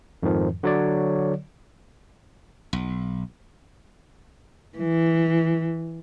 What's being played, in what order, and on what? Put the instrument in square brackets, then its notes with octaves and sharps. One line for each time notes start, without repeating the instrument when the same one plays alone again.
[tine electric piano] F2 G#2 D#3 F3
D3 F#3 C#5 D5
[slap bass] B1
[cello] E3